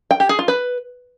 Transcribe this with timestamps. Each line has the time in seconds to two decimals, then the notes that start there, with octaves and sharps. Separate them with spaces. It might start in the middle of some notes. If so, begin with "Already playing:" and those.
0.11 G5
0.20 G4
0.29 G#4
0.39 F4
0.48 B4